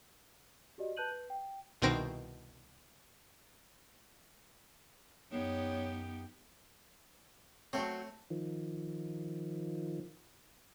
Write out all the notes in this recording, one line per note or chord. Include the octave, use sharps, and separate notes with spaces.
F#4 G4 D5 D#5
B4 A5 F#6 G6 D#7 F#7
B4
G5
C2 B2 D#3 C4 A#6 D7
F#2 B3 D#4 G4 C#5
F#3 A3 C4 C#5
D#3 F3